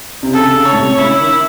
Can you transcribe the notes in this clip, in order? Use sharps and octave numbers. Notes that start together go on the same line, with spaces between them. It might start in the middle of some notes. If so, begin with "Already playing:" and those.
C3
C#3 A4
C#3
C#5
A2
C3
C#3 E4
D#3